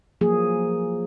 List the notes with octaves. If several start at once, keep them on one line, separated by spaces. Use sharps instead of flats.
F3 F#3 A#3 G#4